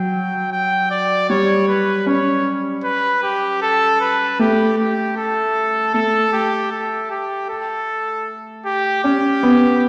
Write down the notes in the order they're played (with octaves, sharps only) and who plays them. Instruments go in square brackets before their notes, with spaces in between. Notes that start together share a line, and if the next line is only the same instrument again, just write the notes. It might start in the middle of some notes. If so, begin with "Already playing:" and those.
Already playing: [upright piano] F#3 [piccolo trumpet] G5
[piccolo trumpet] G5
D5
[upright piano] G3 [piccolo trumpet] C#5
[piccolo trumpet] B4
[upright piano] C#4 [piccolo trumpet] C#5
[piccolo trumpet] B4
G4
A4
B4
[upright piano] A3 [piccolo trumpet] G4
[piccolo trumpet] G4
A4
[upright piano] A3 [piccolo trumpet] A4
[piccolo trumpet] G4
A4
G4
A4
G4
[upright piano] C#4 [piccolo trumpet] G4
[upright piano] B3